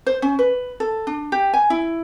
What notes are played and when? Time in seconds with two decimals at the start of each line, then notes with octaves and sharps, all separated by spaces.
0.06 C5
0.22 C#4
0.39 B4
0.80 A4
1.07 D4
1.32 G4
1.54 G#5
1.70 E4